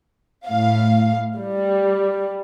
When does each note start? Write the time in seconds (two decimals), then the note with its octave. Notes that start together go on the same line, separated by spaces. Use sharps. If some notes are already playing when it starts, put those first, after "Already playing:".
0.48 A2 F5
1.37 G3